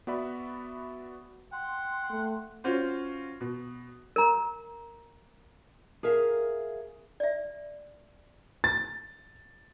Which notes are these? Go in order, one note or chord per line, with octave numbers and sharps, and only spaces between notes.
B3 F#4 D5 E5 B5
F#5 G5 C6
A3
C#4 F4 F#4 C5
B2
A#4 A#5
G#4 A#4 E5 F5
D5 E5
A6